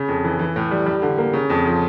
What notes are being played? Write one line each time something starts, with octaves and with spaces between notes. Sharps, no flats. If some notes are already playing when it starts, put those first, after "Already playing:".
Already playing: C#3
F2
E3
E3
A2
G3
G3
D3
A#3
C#3
F2
F3